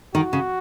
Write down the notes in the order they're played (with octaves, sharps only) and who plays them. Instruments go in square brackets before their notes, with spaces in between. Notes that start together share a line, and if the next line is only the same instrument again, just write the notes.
[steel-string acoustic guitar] D#3 [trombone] F#4
[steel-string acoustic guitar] C#3